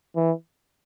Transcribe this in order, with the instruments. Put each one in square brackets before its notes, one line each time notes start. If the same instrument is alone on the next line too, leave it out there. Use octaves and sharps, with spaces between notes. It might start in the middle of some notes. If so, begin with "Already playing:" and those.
[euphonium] E3